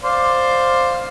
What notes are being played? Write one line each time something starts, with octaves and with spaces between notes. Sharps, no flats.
C5 D5 F5